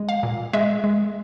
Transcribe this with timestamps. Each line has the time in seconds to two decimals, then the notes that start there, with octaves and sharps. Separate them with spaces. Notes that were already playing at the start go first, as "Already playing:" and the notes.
Already playing: G#3
0.09 F5
0.23 A#2
0.53 G#3 E5
0.84 G#3